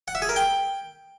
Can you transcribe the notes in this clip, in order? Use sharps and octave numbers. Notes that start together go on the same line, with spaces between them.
F#5
E5
G#4
A#4
G5